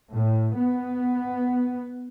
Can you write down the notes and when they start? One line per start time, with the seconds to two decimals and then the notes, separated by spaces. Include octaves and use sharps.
0.11 A2
0.55 B3